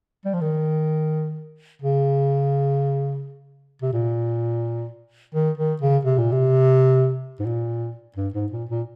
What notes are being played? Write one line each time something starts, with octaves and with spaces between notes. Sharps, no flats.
G3
F3
D#3
C#3
C3
A#2
D#3
D#3
C#3
C3
A#2
C3
G#2
A#2
G2
G#2
A#2
A#2